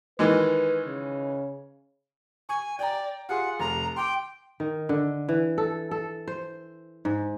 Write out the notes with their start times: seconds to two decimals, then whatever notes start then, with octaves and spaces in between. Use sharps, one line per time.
0.19 D#3 E3 G#3 B4
0.85 C#3
2.49 G#5 C#6
2.79 D5 G5 A#5
3.29 F4 G#4 F#5 C6
3.59 F1 A#5
3.96 G5 C6 D6
4.60 D#3
4.89 D3
5.29 E3
5.58 A4
5.91 A4
6.27 C5
7.05 G#2